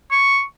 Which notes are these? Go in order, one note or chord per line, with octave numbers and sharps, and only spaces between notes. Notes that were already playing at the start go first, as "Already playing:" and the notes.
C#6